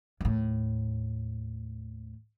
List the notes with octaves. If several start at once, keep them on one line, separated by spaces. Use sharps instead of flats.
D#2 A2